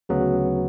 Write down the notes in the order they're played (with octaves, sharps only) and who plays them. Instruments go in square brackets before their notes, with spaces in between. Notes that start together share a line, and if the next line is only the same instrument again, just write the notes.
[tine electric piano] D2 C#3 F#3 B3